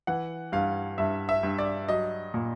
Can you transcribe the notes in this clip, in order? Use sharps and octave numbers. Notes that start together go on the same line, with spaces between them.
E3 F#5
G2 F5
G2 E5
E5
G2
D5
F#3 D#5
A#2